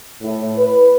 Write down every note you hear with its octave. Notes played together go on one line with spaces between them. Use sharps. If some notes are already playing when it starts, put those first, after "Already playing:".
A2
B4